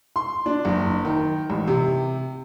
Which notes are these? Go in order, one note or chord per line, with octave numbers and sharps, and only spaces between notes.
C6
D4
F#1
D#3
A1
C3